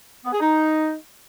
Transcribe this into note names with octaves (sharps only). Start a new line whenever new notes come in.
B3
G#4
D#4